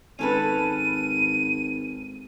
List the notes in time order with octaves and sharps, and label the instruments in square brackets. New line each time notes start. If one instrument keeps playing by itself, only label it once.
[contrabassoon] G#1 [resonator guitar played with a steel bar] C#4 A4 B4 [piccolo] D#7